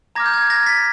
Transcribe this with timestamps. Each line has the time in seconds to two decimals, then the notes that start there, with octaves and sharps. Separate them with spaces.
0.15 A#5 D6 F6 G#6 A#6
0.26 G6
0.34 G#6
0.50 G#6 A#6
0.63 A#6
0.66 A6 B6